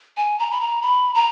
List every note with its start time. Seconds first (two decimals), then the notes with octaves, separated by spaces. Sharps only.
0.17 G#5
0.39 A#5
0.51 B5
0.60 A#5
0.82 B5
1.15 A#5